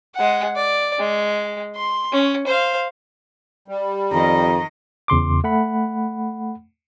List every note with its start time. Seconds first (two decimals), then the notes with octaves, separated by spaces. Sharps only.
0.15 G#3 F#5
0.55 D5
0.99 G#3
1.75 C6
2.12 C#4
2.47 C5 F5
3.68 G3
4.12 F2 D#3 D#5 A#5
5.08 E2 C#3 C6 D6
5.44 A3 F#5 B5